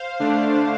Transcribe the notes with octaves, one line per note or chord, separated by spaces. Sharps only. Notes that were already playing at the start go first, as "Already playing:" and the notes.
Already playing: C5 F5
D3 A3 D4